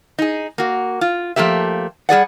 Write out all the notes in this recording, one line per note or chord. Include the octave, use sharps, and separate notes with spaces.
D#4 G#4
A#3 F#4
F4
F3 A3 A#3 G4 E5
G3 G#4 D5 F#5